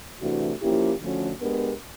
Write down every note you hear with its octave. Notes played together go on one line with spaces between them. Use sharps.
C3 E3 A3 D4 F#4
F3 A#3 C#4 E4 G4
D3 F3 A3 C#4 F#4
G#3 B3 D4 G4 A#4